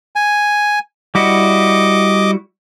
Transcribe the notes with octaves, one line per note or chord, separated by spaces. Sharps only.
G#5
G3 E4 F#4 D#5 D6